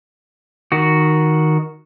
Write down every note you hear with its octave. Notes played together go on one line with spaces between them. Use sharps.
D#3 F#4